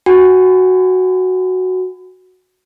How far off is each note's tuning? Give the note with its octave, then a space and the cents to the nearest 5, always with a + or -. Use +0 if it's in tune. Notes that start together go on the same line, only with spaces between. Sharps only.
F#4 +0 G#5 -30